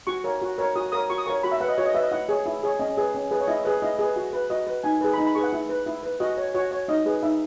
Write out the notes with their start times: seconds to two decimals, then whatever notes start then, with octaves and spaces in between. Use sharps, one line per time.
0.07 F#4 C#6
0.24 A#4 C#5
0.42 F#4
0.58 A#4 C#5
0.76 F#4 D#6
0.92 A#4 C#5 D#6
1.10 F#4 C#6
1.18 D#6
1.26 A#4 C#5 C#6
1.43 F#4 B5
1.51 E5
1.61 B4 F#5
1.69 D#5
1.78 F#4 C#5
1.86 D#5
1.95 B4 E5
2.03 D#5
2.11 E4 F#5
2.29 G#4 C#5
2.46 E4
2.63 G#4 C#5
2.80 C#4 D#5
2.97 G#4 B4
3.14 C#4
3.31 G#4 B4
3.40 C#5
3.47 E4 D#5
3.65 G#4 B4
3.82 E4 D#5
3.99 G#4 B4
4.16 F#4
4.33 B4
4.50 F#4 D#5
4.67 B4
4.84 D#4 G#5
5.01 G#4 B4
5.13 B5
5.18 D#4 A#5
5.26 B5
5.35 G#4 B4 C#6
5.43 F#5
5.53 E4
5.69 B4
5.86 E4
6.03 B4
6.20 F#4 D#5
6.37 C#5
6.54 F#4 C#5
6.71 C#5
6.88 D#4 D#5
7.06 G#4 B4
7.23 D#4 E5